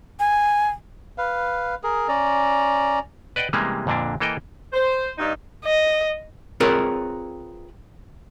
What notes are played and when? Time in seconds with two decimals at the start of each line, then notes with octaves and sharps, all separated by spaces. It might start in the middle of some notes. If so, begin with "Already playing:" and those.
0.20 G#5
1.18 B4 F5
1.83 G#4 A#4
2.08 C#4 D5 A#5
3.36 B4 D5 D#5 F#5 G5
3.53 C3 E3 G3 G#3 A#3 C#4
3.87 F2 A#2 D3 A#3 D4
4.20 E3 A#3 A4 D#5 G5
4.73 C5
5.18 G2 G3 D#4
5.65 D#5
6.60 C4 F4 G#4 A#4 B4 C#5